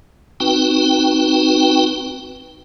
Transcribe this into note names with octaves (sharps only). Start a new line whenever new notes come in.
C4 D#4 F#4 B4 G5